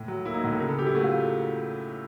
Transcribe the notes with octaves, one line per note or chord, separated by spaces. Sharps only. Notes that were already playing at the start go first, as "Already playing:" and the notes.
Already playing: A2
F#3
A#3 E4
D#4
A2
A4
C#3 A#4
A4
F#3 G4
E4
A3 F#4
F4